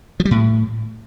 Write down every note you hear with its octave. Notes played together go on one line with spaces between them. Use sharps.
F3
G3
A2